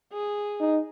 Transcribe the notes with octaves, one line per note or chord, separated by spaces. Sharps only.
G#4
D#4